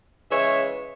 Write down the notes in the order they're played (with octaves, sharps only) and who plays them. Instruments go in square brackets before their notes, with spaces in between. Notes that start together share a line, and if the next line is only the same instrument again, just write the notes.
[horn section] C#3 E3 G#3 C#5 E5